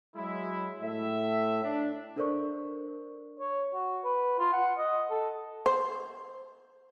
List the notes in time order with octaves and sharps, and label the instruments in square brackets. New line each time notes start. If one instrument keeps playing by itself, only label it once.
[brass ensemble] F#3 G#3 E4
A2 E5
D4
[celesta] D4 A4 A#4 C5 D5 C#6
[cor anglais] C#5
F#4
B4
F4
F#5
D#5
A4
[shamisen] C5